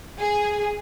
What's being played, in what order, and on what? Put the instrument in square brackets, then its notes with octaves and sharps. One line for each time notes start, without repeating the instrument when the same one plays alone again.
[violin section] G#4